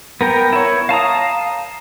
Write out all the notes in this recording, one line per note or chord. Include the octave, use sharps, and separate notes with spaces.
B3 A#4 G5
E4 C#5
F5 A5 A#5 D#6